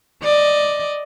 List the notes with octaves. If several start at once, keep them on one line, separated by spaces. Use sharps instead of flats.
D5 D#5